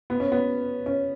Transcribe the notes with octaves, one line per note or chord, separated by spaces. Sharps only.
B3
C#4
B3
C#4